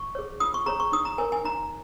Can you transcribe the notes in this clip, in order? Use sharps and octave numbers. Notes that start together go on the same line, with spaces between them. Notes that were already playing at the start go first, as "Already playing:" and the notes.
Already playing: C#6
G#4 C#5
F4 D#6
C#6
G#4 C#5 A#5
C#6
D#4 D#6
A#5
A#4 C#5 G#5
G#5
D#4 A#5